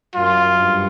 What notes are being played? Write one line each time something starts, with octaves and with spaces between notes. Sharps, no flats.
F#2 F4
G2